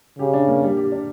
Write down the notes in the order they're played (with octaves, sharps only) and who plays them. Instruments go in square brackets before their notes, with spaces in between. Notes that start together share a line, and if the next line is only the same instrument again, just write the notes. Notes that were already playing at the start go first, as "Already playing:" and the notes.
[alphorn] C#3 [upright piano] G4
[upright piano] D4
A#3
G3
G4
D4